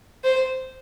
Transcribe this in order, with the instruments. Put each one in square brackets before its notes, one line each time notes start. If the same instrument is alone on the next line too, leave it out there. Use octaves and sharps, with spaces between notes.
[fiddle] C5